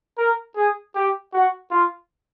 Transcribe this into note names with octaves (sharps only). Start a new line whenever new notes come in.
A#4
G#4
G4
F#4
F4